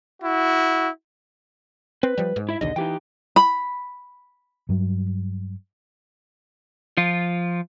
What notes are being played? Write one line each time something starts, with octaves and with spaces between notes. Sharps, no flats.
E4 F#4
C4 B4
F3 G3
G#2
E4 E5
A#1 D#2 D3 D#5
E3 D#4 G4 G5
B5
G2 F#3
F3 F4